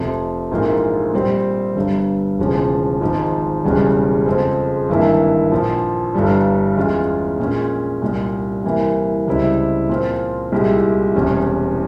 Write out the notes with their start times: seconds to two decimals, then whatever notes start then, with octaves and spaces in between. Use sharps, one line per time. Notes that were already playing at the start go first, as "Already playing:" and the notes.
Already playing: F1 F2 C3 F3
0.51 A#1 G#2 E3 A#3 F4
1.13 A#2 G3 C4 G4
1.76 G1 G2 G3
2.38 E1 E2 C#3 F3
3.01 G#1 G#2 F3
3.64 E1 E2 C#3 G3
4.26 F2 C#3 F3 G#3 C4
4.89 G#1 G2 E3 A#3 E4
5.52 A#1 A#2 F3
6.15 G1 G2 E3 G3
6.77 E2 E3 G#3 C#4 F4
7.39 A#1 A#2 G#3 C#4
8.02 C2 A#2 G3
8.64 C2 C3 E3 A#3
9.28 C#2 C3 G3 C4 E4
9.89 A#2 F3 C4 F4
10.52 C2 A#2 G#3 E4 G4
11.15 E1 E2 C3 G3 C#4